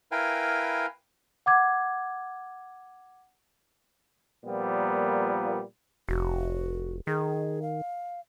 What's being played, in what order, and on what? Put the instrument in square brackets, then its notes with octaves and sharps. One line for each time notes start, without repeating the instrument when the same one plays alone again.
[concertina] E4 A#4 B4 F5 G5 G#5
[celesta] F#5 D6 G#6
[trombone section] A#2 F3 G3 A#3 B3
[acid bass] F1 [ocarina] F#4
[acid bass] D#3 [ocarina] G#4
[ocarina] F5